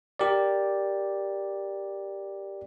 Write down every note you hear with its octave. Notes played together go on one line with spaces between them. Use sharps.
G4 A#4 D5